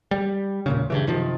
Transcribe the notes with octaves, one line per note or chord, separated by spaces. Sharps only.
G3
E1 A#2 C#3
G2 C#3 E3
F#2 C3 D#3 F3